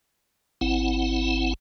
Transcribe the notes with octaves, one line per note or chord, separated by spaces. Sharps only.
G#1 C4 E4 F#5